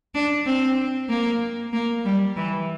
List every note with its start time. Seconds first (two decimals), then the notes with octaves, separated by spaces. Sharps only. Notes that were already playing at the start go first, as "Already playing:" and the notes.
0.14 D4
0.46 C4
1.09 A#3
1.73 A#3
2.05 G3
2.37 E3